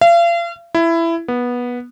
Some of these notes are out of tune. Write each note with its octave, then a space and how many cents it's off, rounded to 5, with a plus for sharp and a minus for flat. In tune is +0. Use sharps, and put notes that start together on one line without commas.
F5 -40
E4 +15
B3 -15